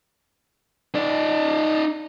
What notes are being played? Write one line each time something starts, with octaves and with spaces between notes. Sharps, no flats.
D#4 D5